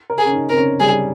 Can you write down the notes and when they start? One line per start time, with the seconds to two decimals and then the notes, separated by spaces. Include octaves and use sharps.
0.10 A#4
0.18 G#4
0.25 C#4
0.33 D#4
0.49 C4 A#4
0.57 C#4
0.80 G3 G#4